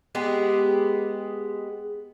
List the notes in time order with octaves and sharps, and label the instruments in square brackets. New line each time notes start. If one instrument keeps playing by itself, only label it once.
[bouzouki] G#3 B3 G4 G#4